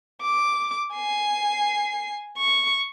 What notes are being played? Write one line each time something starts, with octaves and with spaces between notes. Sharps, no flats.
D6
G#5 C7
C#6